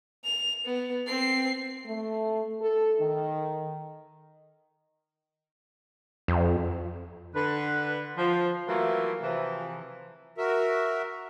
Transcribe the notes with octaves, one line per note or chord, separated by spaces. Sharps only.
F7
B3
C4 C7
A3
A4
D#3
F2
D3 B4
F3
E3 F#3 A3 A#3 E4 F4
C3 E3 F3
F#4 A#4 E5